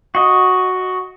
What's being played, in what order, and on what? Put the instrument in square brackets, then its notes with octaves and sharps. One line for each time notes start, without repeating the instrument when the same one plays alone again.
[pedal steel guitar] F#4 D#5